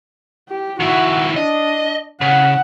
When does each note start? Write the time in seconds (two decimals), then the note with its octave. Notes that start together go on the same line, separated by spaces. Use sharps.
0.49 G4
0.80 D#3 E4 F#4
1.36 D4 D#5
2.21 C#3 F#5